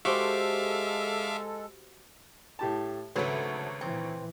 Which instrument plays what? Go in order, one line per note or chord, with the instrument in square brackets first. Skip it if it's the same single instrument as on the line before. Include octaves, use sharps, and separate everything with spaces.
[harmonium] G#3 A4 [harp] F#4 G4 C5 [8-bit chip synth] E5 F5 D6
[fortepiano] A2 G4 A5
[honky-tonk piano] G#1 D2 C#5 [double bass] C#3 [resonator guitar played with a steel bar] F#3 A3 [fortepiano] B4
[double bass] A#2 E3 [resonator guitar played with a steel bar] C4